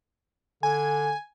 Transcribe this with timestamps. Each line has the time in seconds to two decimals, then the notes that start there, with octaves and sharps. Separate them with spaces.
0.63 D3 G#5